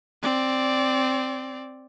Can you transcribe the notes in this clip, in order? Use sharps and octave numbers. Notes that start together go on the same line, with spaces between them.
C4 D5